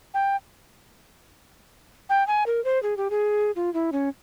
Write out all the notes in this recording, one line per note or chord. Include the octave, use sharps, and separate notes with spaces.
G5
G5
G#5
A#4
C5
G#4
G4
G#4
F4
E4
C#4